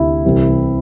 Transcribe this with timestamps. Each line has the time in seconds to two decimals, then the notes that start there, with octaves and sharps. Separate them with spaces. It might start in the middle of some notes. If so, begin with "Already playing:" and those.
Already playing: D2 C3 E4 G4
0.25 C2 C3 E3 G3 C4